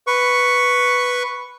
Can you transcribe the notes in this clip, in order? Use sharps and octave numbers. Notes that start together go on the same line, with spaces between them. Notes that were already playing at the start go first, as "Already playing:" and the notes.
B4 C#6